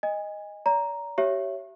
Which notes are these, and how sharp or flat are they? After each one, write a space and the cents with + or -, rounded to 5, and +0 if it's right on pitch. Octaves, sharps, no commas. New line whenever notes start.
D#5 +0 G#5 -25
D5 -45 A#5 +0
G4 -30 C#5 +0 E5 +20